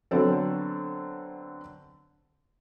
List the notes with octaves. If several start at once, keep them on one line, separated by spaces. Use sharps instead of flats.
D3 F#3 B3 C4 A4